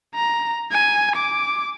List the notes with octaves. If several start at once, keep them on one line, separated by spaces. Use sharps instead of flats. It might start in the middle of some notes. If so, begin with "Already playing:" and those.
A#5
G#5
D6